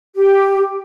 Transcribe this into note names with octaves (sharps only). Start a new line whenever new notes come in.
G4